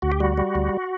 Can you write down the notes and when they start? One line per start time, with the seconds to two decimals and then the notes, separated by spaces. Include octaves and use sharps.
0.02 D2 F#4
0.12 G4
0.20 G3 F#4
0.38 G3
0.55 D2